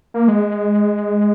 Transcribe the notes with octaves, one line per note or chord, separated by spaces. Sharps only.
A#3
G#3